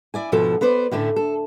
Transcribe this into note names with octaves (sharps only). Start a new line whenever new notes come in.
E4 D5 G#5
D2 G#2 B2 F3 A4
B3 B4 C5 D5
A2 D3 A3 C#4
A4